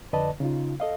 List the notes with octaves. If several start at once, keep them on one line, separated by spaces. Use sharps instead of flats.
F2 D3 B4 D5 D#5 A5
C#3 D#4 F4
A4 D#5 F5